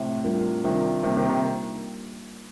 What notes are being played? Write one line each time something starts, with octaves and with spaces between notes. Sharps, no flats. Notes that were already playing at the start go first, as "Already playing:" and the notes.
Already playing: A2 C3
G3 D4 F4 A#4
C3 D#3 G3 D4 F4 A#4
C3 D#3 G3 A#3 D#4 A#4
C3 D#3
C3 D#3